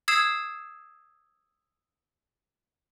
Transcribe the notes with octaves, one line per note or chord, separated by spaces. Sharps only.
D#6 E6 G#6 C7 E7